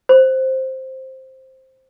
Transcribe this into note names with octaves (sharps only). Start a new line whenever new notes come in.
C5